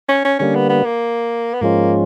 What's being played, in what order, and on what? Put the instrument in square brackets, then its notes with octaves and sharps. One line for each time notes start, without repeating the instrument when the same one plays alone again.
[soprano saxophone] C#4
C#4
[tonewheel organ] D3 G3 A#3 [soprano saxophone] C#4
[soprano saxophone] B3
B3
A#3
B3
[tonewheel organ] G#2 F3 G#3 C#4 F4 [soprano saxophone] A#3